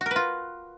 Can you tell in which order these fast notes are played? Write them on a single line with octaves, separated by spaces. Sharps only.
F#4 A#4 B4 F4